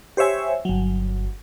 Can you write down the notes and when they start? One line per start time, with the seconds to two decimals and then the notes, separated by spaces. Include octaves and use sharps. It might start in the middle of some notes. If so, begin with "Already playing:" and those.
0.17 G4 C5 C#5 E5 G#5
0.65 G1 F#3